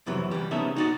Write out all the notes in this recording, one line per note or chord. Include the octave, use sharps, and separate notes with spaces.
C2 F2 C3 E3 F#3
E3 G3
C2 C#3 B3 D#4 A4 E5
D#4 F#4 D5